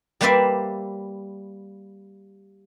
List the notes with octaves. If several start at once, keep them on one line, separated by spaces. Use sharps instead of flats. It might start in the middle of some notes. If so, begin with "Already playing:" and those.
G3 A#3 B4 C5 D5 E5